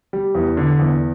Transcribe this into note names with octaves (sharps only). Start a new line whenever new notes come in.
G3
E2
D3
E2